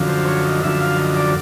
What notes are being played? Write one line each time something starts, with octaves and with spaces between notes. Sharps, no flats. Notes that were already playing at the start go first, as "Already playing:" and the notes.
Already playing: F#2 D3 F3
C5
C#5
D#5
F#2 D3 F3 E5
F5
D#5
D5